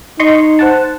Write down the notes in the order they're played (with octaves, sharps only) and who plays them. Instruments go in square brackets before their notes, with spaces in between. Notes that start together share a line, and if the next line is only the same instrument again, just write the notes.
[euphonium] D#4 [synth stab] D#5 C6 C#6
[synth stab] C5 F#5 A5